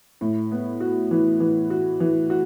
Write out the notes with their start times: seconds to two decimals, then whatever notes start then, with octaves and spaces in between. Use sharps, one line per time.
0.21 A2
0.51 B3
0.80 F#4
1.11 E3
1.40 E3
1.70 F#4
2.00 E3
2.30 F#4